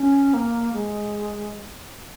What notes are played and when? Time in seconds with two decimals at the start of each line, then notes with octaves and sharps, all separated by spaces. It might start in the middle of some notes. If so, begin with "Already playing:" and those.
Already playing: C#4
0.34 A#3
0.73 G#3